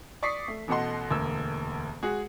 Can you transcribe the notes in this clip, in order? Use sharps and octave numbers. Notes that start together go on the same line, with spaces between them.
D5 C#6 D#6 B6 C7
A3
A1 B2 A4 D#5 F#5 C6
E1 D2 A#3 E6
G#3 F#4 G#4